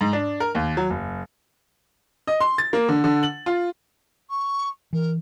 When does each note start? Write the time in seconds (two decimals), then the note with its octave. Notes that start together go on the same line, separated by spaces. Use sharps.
0.01 G#2
0.13 D4
0.40 A#4
0.55 D#2
0.77 F#3
0.90 F#1
2.27 D#5
2.41 C6
2.58 A6
2.73 A#3
2.88 D3
3.04 D3
3.23 F#7
3.46 F4
4.29 C#6
4.93 E3 A#4